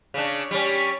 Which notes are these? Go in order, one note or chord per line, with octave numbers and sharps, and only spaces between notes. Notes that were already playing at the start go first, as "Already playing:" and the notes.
C#3 D4
G3 C#4